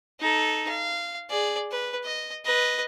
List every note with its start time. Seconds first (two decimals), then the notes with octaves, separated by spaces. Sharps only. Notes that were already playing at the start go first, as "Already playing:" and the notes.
0.20 D#4 A4
0.68 F5
1.30 G#4 D5
1.71 B4
2.04 D#5
2.45 B4 D#5